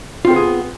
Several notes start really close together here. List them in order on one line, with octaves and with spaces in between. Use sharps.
F4 C4 A4 B3 G#4